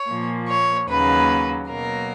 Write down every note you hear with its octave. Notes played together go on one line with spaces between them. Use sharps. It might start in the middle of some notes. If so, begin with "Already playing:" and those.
Already playing: C#5
A#2 F3 A#3
C#5
D#2 C#3 F#3 A#3 B4
B2 F#3 A#3 A#4